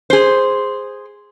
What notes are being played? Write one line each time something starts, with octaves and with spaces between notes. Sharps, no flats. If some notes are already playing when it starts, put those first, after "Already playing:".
G#4 C5